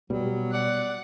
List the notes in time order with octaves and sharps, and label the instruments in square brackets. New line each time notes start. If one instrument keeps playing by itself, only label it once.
[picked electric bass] B2 [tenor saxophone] F#3 [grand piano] G3
[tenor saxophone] D5 [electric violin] F#5